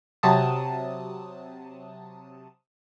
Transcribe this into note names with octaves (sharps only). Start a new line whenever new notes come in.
C3 F#3 A5 D#6